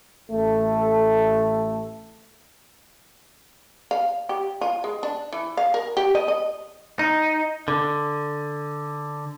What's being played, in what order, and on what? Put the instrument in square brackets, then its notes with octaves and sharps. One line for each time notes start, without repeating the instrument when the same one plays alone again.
[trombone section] A1 A3 A4
[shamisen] F5
G4
F4
G#3
D4
E3
F5
A#4
G4
D#5
D#5
[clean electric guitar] D#4
D3